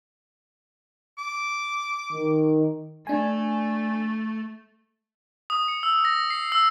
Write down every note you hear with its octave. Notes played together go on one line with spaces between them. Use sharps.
D6
D#3
A3 D4 G#5
D#6
C#7
E6
A#6
C7
E6